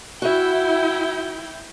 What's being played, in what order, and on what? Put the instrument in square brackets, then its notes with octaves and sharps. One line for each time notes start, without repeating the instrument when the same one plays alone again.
[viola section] E4 G5 [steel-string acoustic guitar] F#4 E5